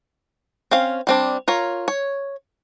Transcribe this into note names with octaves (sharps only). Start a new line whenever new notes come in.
C4 C#4 F5
G3 C4 D4
F4 A#4 C#5
C#5